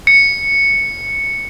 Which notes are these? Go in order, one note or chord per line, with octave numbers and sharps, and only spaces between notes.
C#7